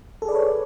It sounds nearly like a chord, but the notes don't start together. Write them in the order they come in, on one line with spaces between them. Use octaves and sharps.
A4 G#4 D5 B4 C#5